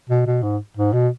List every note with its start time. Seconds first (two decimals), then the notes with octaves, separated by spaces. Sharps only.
0.10 B2
0.27 B2
0.43 G#2
0.78 G#2
0.93 B2